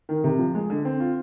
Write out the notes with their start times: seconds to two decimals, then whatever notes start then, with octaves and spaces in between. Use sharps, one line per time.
0.09 D#3
0.24 C3
0.39 F3
0.55 G#3
0.70 D3
0.85 C4
1.00 F4